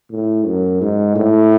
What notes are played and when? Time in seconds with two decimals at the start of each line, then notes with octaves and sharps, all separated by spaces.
0.11 A2
0.46 F#2
0.82 G#2
1.16 A2